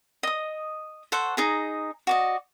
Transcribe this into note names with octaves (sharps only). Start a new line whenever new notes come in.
D#5 D#6
A4 C5 F#5 C#6
D#4 G#4 A#5
F#4 D5 D#5